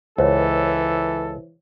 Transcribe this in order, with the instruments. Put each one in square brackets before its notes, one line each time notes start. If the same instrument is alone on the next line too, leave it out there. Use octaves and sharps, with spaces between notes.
[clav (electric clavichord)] C#2 [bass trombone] E3 [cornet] A4 [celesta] C5 C#5